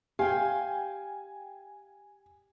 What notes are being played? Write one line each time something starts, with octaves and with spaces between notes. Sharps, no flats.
G4 F5 G5 G#5